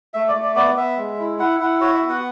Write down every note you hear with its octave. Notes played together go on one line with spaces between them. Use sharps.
A3 E5
D5
A3
D5
B3 D5
B3 E5
G#3
E4
E4 F#5
E4 F#5
F#4 C#5
E5
B3
F#5